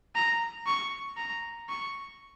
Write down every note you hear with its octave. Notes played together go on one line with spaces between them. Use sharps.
A#5
C#6
A#5
C#6